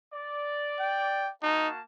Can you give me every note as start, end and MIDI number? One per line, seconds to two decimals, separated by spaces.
0.13 1.27 74
0.80 1.30 79
1.43 1.80 58
1.43 1.68 63
1.43 1.80 66
1.43 1.80 81